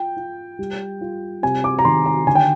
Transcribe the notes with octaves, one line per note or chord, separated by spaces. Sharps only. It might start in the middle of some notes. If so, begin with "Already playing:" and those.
Already playing: F4 G5
F4
G3
F4
C3 G#5
D6
A#5
D#3 C6
A#5
D3 G#5
G5